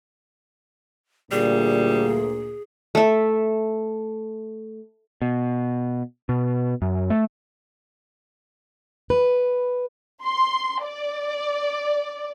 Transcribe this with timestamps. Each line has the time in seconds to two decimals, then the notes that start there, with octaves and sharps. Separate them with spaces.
1.32 D2 A#2 G3 G#4
2.95 A3 E5
5.22 B2
6.29 B2
6.82 F#2
7.10 A3
9.10 B4
10.23 C6
10.84 D5